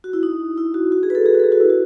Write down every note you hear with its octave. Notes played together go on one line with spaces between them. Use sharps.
F#4
E4
D#4
E4
F#4
F#4
G#4
B4
A4
G#4
F#4
A4
G#4
F#4
E4
F#4